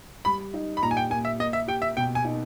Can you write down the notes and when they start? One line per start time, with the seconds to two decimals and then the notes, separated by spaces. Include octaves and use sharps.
0.25 G3 B5
0.53 D#4
0.77 B5
0.82 A#2 A#5
0.91 G#5
0.97 G5
1.10 A#3 G#5
1.25 E5
1.40 A#3 D#5
1.53 E5
1.67 G4 G5
1.82 E5
1.97 B2 G5
2.15 G#5
2.24 D#4